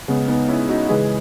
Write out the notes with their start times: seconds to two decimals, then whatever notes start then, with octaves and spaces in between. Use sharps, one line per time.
0.08 C#3 G#3 B3
0.28 B3 D#4
0.49 C#4 E4
0.69 D#4 F#4
0.89 C#3 E3 G#3 G#4 B4